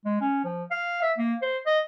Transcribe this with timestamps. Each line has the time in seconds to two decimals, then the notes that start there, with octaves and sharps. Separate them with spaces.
0.05 G#3
0.21 C#4
0.45 F3
0.71 F5
1.02 E5
1.18 A#3
1.42 C5
1.67 D#5